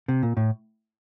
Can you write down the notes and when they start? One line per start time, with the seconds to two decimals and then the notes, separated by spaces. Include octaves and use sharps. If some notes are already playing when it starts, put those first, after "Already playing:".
0.08 C3
0.23 A#2
0.37 A2